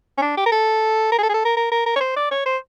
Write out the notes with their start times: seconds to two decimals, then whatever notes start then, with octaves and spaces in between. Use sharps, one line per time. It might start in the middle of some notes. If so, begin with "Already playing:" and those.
0.18 C#4
0.22 D4
0.37 G4
0.46 A#4
0.52 A4
1.12 A#4
1.18 G#4
1.23 A4
1.29 G#4
1.34 A4
1.45 A#4
1.56 A#4
1.72 A#4
1.86 A#4
1.96 C#5
2.01 C5
2.16 D5
2.31 C#5
2.46 C5